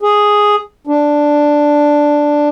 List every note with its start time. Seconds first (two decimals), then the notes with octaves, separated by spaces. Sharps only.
0.02 G#4
0.87 D4